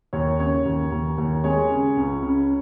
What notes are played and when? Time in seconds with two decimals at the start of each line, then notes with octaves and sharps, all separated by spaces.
0.13 D#2 C#5
0.39 C#3 C#5
0.65 D#2
0.91 D#2
1.18 D#2
1.44 G#3 C#5
1.70 C#3
1.97 C#2
2.23 C#3